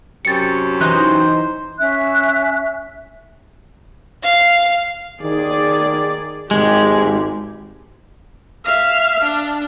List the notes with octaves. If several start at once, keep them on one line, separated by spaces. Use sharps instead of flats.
F#2 C3 G4 A6 C#7
E3 D#4 C5 F#6
C#4 E5 F#6
F5
D#3 G#4 D5
G#1 G#3 G4
E5 F5
D4